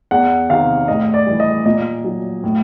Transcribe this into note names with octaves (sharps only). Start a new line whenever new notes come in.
E2 F#5
C3 D#3 F5
A2 D#5
D5
E3 G3
D#5
A#2 D#5
F#3
A2